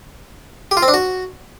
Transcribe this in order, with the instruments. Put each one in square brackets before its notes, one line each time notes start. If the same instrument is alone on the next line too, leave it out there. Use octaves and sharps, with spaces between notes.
[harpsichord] G4
F4
C4
D4
F#4